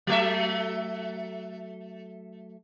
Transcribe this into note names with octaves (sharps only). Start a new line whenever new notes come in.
F#3 A3 E5